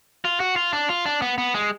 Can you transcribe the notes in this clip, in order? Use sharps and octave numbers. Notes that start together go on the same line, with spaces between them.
F4
F#4
F4
D4
F4
D4
B3
B3
G#3